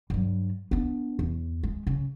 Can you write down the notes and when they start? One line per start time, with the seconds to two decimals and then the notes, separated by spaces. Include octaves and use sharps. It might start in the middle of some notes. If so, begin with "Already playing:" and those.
0.10 G2 F#3
0.71 B3 D4
1.19 E2
1.63 G#3
1.87 C#3